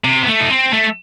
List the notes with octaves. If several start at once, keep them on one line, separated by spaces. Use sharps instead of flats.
C3
B3
A3
D#4
C4
A3